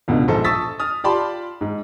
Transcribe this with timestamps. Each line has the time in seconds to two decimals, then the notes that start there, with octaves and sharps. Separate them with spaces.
0.08 C#2 B2 D3
0.28 A#1 G#2 A4 C5
0.44 A5 C#6 D#6 E6 A6 B6
0.80 D#6 F6 A6
1.04 F4 G4 D5 A5 B5 C6
1.61 G#2